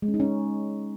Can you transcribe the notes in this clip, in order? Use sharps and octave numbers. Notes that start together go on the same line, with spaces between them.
G#3
C#4
D#4
C#4